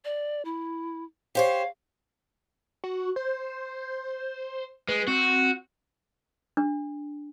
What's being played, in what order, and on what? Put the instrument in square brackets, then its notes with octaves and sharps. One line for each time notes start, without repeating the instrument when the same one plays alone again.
[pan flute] D5
E4
[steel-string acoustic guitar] G4 C5 C#5 [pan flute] F5
[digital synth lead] F#4
C5
[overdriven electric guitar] G#3 [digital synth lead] B4
[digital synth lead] C4 [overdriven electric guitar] F#4
[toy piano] D4